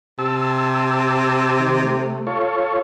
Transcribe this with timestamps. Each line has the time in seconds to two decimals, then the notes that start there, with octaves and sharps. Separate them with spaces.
0.19 C3 A5 E6
1.60 D#3
1.84 A3
2.27 F4 A4 C#5